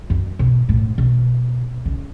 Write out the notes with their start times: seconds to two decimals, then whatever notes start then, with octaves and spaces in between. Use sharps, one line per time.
0.10 F#2
0.39 B2
0.69 A2
0.98 B2
1.86 C#3